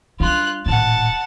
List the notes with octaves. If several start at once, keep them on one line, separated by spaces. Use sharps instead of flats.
G3 D4 F4 F#6
D#1 A2 F#5 A5